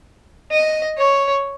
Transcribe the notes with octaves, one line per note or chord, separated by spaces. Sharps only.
D#5
C#5